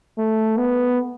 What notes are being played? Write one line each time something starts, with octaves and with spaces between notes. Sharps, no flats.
A3
B3